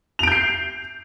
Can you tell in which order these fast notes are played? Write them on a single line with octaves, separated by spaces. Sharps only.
F7 D7 G6 C7